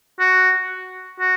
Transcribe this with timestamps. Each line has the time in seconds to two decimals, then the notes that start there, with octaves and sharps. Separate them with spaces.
0.19 F#4
1.19 F#4